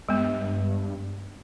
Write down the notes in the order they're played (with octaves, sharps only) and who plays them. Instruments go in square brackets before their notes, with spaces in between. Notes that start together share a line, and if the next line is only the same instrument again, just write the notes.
[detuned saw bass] G2 [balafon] G#3 B3